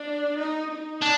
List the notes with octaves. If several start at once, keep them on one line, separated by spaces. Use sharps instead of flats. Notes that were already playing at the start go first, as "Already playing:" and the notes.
Already playing: D4
D#4
D#4
D4